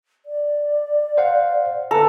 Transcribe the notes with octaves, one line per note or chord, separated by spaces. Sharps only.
D5
C5 F5 F#5
D3 A4 B4 A#5